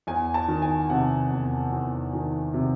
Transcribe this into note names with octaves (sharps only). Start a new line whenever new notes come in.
E2 G#5
A5
D#3
G#5
C3 F#5
E2
E2
D#3
C3